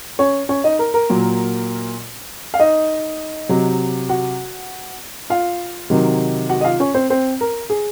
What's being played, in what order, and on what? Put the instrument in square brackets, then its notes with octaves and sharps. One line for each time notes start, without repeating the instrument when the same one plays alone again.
[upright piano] C#4 C#5
C#4 C#5
D#4 D#5
A#4
A#4
A#2 F#3
F5
D#4 D#5
C3 F#3
F#4 F#5
F4 F5
C3 D#3 F#3
F#4 F#5
D#5
F4 F5
C#4 C#5
C4 C5
C4 C5
A#4
G#4